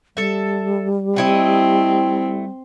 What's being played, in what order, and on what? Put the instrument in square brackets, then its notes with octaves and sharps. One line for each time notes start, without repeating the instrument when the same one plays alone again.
[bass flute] G3 [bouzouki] A4 E5
[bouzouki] A3 E4 D#5 [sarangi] C4